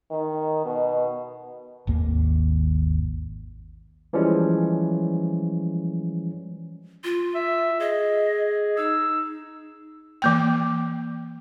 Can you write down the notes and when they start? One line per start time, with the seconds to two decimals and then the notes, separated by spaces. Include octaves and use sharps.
0.11 D#3
0.65 B2
1.87 G#1 D#2 A#3
4.13 E3 F3 G3 G#3 C#4
7.04 F4
7.35 E5
7.80 G#4 D#5
8.77 D#4 E6
10.22 E3 A#3 G5